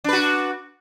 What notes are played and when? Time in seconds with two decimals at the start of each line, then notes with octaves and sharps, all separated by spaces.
0.04 D4
0.09 B4
0.13 F#4